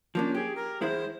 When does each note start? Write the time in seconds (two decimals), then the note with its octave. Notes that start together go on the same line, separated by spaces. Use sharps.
0.15 F3 A#3 C#4 D4
0.35 G4 G#4
0.55 A#4
0.81 E2 G#3 E4 C5